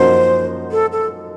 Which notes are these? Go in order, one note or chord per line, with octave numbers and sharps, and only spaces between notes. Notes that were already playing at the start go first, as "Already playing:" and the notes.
Already playing: F#2 F3 A#3 D#4 F#4 C5
A4
A4